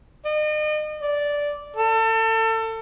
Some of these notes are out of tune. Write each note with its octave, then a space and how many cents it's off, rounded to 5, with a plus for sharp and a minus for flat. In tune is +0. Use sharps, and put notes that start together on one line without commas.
D#5 -40
D5 -10
A4 +30